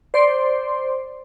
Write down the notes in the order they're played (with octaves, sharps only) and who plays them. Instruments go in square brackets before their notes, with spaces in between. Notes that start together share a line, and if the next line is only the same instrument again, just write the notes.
[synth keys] C5 D5 C6